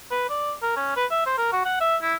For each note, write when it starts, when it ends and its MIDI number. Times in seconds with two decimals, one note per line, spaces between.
0.11 0.26 71
0.29 0.53 74
0.62 0.75 70
0.76 0.92 61
0.96 1.05 71
1.11 1.26 76
1.26 1.36 72
1.38 1.48 70
1.52 1.62 66
1.65 1.80 78
1.81 1.96 76
2.02 2.14 64